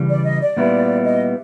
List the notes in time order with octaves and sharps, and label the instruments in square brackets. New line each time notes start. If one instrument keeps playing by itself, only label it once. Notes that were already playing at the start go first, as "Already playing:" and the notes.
Already playing: [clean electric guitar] C#3 E3 G3
[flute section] D5
D#5
D5
[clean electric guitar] A#2 G3 B3 E4
[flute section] D#5